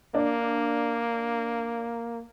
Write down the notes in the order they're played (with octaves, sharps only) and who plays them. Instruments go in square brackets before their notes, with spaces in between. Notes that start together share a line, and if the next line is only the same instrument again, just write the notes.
[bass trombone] A#3 [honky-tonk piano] D4